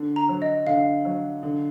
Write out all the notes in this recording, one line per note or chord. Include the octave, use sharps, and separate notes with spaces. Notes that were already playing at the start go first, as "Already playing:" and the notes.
Already playing: D3
A#5
F#3
D#5
D3 F5
F#3
D3